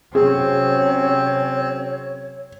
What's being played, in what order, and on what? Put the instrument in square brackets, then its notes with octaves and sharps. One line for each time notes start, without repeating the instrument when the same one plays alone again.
[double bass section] C3 F#3 C#4 [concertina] C4 [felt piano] G#4 [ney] C#5